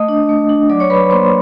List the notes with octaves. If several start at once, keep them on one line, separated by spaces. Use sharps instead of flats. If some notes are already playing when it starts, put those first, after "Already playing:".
Already playing: A3 D#5 D#6
D4
A3
D4
F#3 D5 D6
C#5 C#6
F#3 B4 B5
A#3 C5 C6